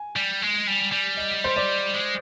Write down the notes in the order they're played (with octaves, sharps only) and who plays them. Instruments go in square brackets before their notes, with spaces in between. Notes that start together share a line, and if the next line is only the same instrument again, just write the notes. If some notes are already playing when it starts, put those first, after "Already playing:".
Already playing: [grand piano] G#5
[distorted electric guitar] G3
G#3
G3
G3
[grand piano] D#5
C5
D5
[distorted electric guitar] G#3